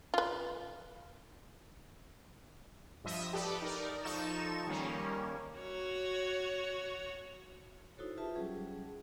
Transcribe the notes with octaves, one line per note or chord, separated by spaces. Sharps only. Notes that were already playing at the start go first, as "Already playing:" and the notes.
F4 B4
G2 F3 D#5 E5 D#6 E7
G4 A4 B4 D5
D#4 A#4 D5
F3 D#4 A4 C#6 E7
D#3 G3 A#3 C#4
F#4 C#5
D#4 E4 F#4 A4 C5 C#5
F4 G4 G#4 B4 E5 A5
F#3 G3 C#4 G#4